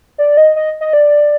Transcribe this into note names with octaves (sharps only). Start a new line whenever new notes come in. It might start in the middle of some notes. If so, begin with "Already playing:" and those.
D5
D#5
D#5
D#5
D5